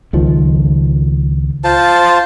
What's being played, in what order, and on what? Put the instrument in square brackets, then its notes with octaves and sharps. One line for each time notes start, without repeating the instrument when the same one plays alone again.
[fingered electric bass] C#2 D#3 F3
[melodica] F4 C5 A5